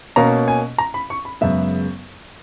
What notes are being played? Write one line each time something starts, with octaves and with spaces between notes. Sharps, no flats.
B2 A#3 C#4 A#5
G#5
A#5
B5
C#6
B5
F#2 C#3 G#3 B3 E5